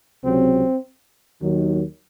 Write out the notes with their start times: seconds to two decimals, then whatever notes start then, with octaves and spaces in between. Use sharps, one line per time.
0.23 C#2 C3 F#3 C4
1.41 D#2 D#3 F#3